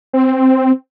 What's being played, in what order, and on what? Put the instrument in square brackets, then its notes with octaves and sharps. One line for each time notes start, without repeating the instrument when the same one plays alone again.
[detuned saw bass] C4